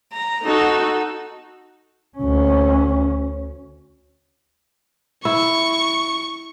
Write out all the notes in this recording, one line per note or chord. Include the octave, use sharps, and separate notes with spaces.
A#5
D#4 F#4 A4
D2 C#4
E4 C#6